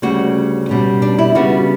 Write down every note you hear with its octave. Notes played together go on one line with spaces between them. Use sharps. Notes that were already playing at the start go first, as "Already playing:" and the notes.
D2 C#3 G3 C#4 F#4
B2 G3 C#4
D4
E4
C#3 G3 B3 D4 F#4